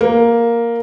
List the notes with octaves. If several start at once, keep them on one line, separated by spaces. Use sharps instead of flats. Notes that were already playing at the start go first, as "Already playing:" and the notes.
A#3